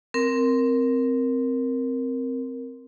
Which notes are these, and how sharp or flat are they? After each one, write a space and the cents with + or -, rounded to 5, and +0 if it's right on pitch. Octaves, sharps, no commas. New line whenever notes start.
C4 -5 A#4 +0